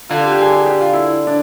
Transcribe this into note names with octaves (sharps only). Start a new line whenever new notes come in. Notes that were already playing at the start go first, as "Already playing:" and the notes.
D3 F4
G4
G4
G#4
G#4
G4
F4
E4
D4